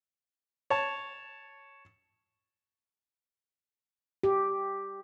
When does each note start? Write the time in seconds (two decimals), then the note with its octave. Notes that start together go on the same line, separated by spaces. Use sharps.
0.70 C#5 A5
4.23 G4